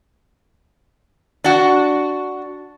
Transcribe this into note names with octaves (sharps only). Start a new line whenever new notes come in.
D4 F#4